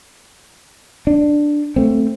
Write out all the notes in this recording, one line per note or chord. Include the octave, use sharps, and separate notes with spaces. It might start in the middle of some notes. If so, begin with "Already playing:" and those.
D4
A3 C4